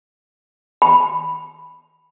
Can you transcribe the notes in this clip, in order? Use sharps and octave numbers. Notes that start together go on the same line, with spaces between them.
B5